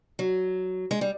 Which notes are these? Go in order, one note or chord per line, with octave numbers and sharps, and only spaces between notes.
F#3
G#3
G3